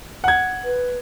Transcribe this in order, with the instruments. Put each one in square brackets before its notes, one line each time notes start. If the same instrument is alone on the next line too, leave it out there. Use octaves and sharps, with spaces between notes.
[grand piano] F#5 G#6
[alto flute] B4